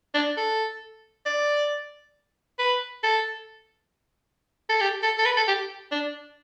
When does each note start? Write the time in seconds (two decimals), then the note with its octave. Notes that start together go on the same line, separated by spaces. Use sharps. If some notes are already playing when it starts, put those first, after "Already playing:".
0.14 D4
0.37 A4
1.26 D5
2.59 B4
3.04 A4
4.69 A4
4.81 G4
5.02 A4
5.18 A4
5.25 B4
5.37 A4
5.48 G4
5.92 D4